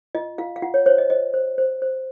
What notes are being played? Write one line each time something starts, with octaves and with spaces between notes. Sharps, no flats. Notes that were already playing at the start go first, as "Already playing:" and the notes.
F4 D#5
F4 F5
F5
F4 F#5
C#5
C5 C#5
D#5
C5 D#5
C5
C5
C5